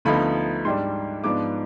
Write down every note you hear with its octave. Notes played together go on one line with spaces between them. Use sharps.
D2 D3 F3 B3 D#4 B5
G#2 G3 D4 C6
G#2 F3 B3 D4 D6